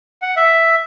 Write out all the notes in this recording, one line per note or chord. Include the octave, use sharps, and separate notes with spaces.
F#5
E5